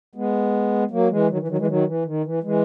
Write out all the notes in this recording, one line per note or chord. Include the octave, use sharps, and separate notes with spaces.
G#3 B3
F#3 A#3
E3 G#3
D#3 F#3
E3
D#3 F#3
E3 G#3
D#3 F#3
E3
D#3
E3
E3 G#3